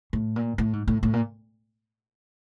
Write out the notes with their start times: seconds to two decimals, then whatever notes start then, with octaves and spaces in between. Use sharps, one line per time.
0.13 A2
0.36 A#2
0.58 A2
0.73 G#2
0.88 A2
1.03 A2
1.13 A#2